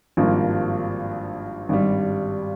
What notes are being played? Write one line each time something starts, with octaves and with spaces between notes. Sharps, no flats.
G#1 G2 F3 A#3
G#1 G2 G3